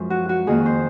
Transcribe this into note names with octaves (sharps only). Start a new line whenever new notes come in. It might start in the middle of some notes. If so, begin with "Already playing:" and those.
Already playing: F#2 F3 G#3 C#4
F#4
F#4
F2 D#3 A#3 G#4
C5